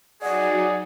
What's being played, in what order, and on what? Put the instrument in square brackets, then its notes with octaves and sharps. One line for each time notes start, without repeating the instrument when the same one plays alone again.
[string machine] F#3 D#4 F#4 [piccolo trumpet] G#4 [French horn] D5 [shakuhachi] F#5